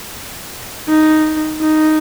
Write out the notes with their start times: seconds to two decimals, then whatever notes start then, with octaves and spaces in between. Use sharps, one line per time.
0.89 D#4
1.61 D#4